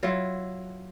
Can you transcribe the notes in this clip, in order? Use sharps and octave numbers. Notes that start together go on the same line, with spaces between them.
F#3 E4 F4